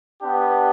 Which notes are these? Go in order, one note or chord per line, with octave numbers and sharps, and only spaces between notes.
B3 D4 G4